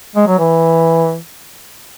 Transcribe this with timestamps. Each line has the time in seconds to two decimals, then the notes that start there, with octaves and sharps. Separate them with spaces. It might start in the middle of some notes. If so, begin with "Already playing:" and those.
0.16 G#3
0.27 F#3
0.39 E3